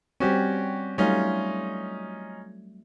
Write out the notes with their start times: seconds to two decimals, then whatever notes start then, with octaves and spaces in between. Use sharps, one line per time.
0.20 G3 C4 C#4 F#4 G4
0.98 F#3 G3 A3 C#4 D#4 F4